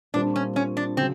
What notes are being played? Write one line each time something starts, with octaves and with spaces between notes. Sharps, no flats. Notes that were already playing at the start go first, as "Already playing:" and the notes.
A#2 G3 C4 D4 F4
C#4
C#4
D4
C#3 F#3 C4